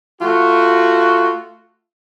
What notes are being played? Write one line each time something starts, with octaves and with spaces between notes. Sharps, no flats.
A3 F4 F#4